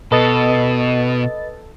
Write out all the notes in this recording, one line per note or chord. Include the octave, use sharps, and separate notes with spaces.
B2 A4 B4 D#5 A6